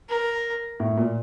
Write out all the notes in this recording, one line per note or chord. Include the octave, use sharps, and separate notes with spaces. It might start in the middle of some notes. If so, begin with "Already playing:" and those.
A#4
A2
A#2